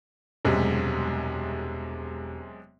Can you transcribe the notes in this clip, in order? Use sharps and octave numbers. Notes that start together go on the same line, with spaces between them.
E1 F#2 C3 G3 G#3